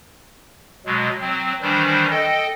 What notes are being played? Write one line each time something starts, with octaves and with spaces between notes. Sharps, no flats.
B2 F#3 G#3
F#3 C4
D#3 E3 G3 D4 C5
A4 D#5 G5